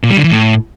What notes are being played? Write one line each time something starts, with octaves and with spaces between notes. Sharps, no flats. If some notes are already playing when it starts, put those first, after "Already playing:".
A#2
G3
D3
E3
A2